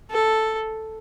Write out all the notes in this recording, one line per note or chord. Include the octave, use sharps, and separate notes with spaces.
A4